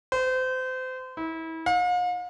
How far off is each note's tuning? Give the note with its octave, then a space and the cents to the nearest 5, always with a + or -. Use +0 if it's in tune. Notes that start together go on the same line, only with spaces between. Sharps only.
C5 -30
E4 -30
F5 +45